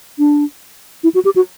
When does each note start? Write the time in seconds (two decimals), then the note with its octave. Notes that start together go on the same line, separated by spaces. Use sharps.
0.18 D4
1.03 E4
1.14 F#4
1.25 G4
1.36 F#4